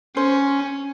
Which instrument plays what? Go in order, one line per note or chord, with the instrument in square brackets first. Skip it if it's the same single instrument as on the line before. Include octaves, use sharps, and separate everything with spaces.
[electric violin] C#4 [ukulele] C5